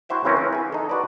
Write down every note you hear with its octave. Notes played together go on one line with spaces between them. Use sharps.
E4 F#4 C5 E5 G5
C#3 E3 C4 C#4 A#4
E3
G#4 G#5
D#4 A4
F#4 B4 C5 D5